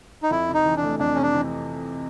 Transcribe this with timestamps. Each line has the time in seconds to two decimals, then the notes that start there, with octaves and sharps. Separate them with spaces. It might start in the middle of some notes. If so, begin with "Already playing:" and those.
0.23 D#4
0.31 F2 E4
0.49 C3
0.54 D#4
0.65 E3
0.76 D4
0.82 A3
0.99 F2 D4
1.15 C3 C#4
1.22 D4
1.34 E3